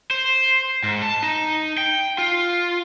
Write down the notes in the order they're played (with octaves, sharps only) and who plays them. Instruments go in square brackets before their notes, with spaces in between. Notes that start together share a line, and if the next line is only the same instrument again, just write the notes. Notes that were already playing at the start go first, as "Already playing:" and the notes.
[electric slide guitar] C5
G#2
A5
D#4
G5
F4